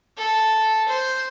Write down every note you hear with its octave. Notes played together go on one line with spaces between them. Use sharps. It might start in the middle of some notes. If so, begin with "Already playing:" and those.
A4
C5